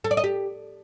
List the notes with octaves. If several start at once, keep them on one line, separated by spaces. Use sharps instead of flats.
A4
D5
D#5
G4